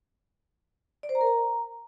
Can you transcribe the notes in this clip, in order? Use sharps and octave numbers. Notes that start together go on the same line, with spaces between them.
D5
C5
A#5
A#4
A#5